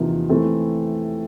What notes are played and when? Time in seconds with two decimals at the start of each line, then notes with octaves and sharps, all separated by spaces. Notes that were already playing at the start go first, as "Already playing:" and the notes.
Already playing: E2 C3 F3 A#3 D#4
0.29 E3 A3 C4